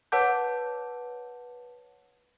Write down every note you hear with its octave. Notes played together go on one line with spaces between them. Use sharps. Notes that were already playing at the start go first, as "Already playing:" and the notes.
B4 C#5 F#5 A5 D6 G6